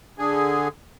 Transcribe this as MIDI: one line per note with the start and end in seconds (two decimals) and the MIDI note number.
0.19 0.68 50
0.19 0.68 68